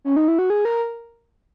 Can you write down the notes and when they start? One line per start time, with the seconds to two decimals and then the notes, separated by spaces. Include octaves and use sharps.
0.05 C#4
0.16 D#4
0.28 E4
0.39 F#4
0.50 G#4
0.65 A#4